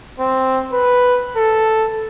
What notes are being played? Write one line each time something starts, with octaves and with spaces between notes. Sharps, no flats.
C4
B4
A4